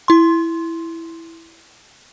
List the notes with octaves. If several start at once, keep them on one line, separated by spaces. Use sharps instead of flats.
E4 C6